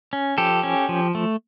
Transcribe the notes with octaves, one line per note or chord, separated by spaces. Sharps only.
C#4
F3 G4 A4
C#4
F3
A3